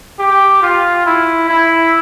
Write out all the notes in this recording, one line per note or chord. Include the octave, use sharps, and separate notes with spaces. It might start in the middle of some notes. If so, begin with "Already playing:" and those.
G4
F4
E4
E4